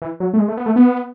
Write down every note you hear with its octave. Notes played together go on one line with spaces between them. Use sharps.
E3
F#3
A3
G#3
A3
B3
A3
B3